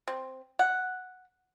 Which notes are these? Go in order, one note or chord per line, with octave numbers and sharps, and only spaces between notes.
C4
F#5